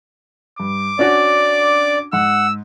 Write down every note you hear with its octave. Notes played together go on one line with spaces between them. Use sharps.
G2 D6
C#4 D4 F#4 D5
G#2 F#5 E6